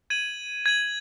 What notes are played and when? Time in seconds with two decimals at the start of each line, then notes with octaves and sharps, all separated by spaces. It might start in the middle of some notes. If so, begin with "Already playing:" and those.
0.10 G#6 D#7 F#7
0.66 G#6 D#7 F#7